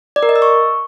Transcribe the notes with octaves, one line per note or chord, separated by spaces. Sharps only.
D5
A#4
D#5
E6
C#6